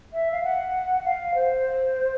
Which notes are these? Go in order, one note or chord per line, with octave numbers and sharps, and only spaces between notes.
E5
F5
F#5
F5
C5